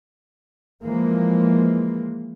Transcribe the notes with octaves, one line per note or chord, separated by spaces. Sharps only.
E3 F3 G#3 A#3